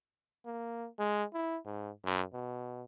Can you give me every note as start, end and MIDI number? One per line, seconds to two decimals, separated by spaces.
0.45 0.88 58
0.99 1.24 56
1.34 1.57 64
1.65 1.90 44
2.05 2.22 42
2.33 2.83 47